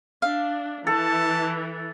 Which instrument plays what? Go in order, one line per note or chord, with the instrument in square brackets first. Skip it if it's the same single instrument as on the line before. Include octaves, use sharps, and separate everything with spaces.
[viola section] D4 [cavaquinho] E5 F5
[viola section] E3 [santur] A4 [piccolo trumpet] A5